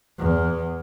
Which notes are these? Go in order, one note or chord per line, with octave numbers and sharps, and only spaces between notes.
E2